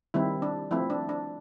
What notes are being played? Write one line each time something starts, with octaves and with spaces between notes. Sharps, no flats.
D#3 G3 C4 E4
D4
F3 A3 C4 E4
D4
D4